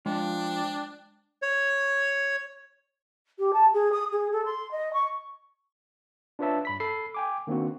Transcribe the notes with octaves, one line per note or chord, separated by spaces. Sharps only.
F3 G#3 D4 G5
C#5
G4
A5
G#4
D#6
G#4
A4
C6
D#5
C#6
D4 F4 B4 C#5 E5 A5
G2 B5 B6
A4 B5 C7
G5 G#5 D6
D#3 A#3 C4 D4 F#4